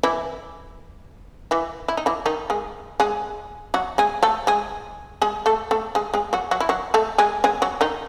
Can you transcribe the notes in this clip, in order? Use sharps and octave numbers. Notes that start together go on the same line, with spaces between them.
E3 E4
E3 E4
E4
D#4
E3 E4
D#3 D#4
G#3 G#4
G#3 G#4
F#3 F#4
G#3 G#4
A3 A4
G#3 G#4
G#3 G#4
A3 A4
A3 A4
G#3 G#4
G#3 G#4
F#3 F#4
F#3 F#4
E4
F#3 F#4
A3 A4
G#3 G#4
G#3 G#4
F#3 F#4
D#3 D#4